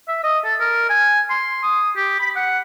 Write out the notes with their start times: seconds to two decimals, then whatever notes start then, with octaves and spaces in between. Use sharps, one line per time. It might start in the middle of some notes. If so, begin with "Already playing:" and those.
0.08 E5
0.24 D#5
0.45 A4
0.60 A#4
0.89 G#5
1.30 C6
1.63 D#6
1.96 G4
2.20 B5
2.36 F#5